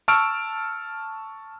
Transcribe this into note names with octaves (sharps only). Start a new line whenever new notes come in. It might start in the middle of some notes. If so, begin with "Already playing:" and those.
A5 C#6 E6 F6 D7